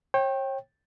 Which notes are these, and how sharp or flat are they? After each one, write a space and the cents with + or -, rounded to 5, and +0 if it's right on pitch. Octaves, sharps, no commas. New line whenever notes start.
C#5 -40 G5 +0